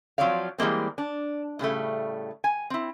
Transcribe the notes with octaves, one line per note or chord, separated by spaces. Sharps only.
F3 F#3 C4 C#5 D5 F5
E3 G3 G#3 A#3 C4
D4
A2 C#3 G3 A3
G#5
C4 E4